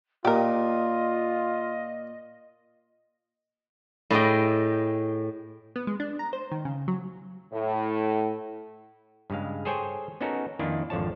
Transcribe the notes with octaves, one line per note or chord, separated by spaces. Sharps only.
A#2 F4 G4 A#4 D#5
A2 G#4 D#5 G5
B3
G#3
D4
A#5
C5
D#3
C#3
F#3
A2
G2 C#3 G#3 F5
G#4 A4 C5 C#5 G5 G#5
B3 C#4 D#4 F#4 A4 A#4
F2 D#3 A#3 D4 E4 F4
G#1 F2 D3 F3 C#5 A5